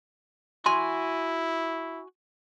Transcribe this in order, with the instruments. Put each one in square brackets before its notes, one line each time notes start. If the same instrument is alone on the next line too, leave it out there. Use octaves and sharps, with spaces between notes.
[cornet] E4 [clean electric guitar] F#4 G#5 [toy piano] C6